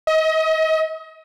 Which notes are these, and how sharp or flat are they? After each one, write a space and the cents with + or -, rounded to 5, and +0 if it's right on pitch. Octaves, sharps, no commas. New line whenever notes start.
D#5 +25